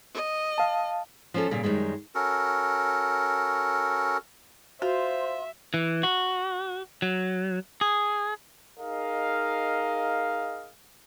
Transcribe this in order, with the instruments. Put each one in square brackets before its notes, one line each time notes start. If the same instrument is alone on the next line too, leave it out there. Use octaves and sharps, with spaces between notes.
[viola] D#5
[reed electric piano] F5 A5
[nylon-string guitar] F3 C#4 A4
A#2 C#3 G3
F#2 A2 D#3 G3 G#3
[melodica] C#4 F#4 A4 A#4
[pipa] F4 [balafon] F#4 [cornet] C5 [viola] E5
[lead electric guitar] E3
F#4
F#3
G#4
[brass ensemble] D#4 G#4 A#4 D#5 F5